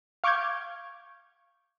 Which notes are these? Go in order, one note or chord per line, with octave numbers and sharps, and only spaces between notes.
F5 C#6 D6 F6 G6 G#6